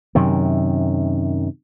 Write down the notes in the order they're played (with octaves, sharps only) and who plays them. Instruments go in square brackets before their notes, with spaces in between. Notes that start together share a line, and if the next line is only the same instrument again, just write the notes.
[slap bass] F#2 C3 D#3